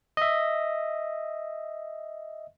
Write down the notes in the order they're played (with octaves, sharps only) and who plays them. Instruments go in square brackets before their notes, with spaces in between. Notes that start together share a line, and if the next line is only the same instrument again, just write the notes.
[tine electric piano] D#5 E5